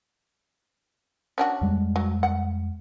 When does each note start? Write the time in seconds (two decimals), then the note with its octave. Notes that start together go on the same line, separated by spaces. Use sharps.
1.38 C#4 D4 F#4
1.61 F2 G3 G#3
1.96 F#3
2.23 F#5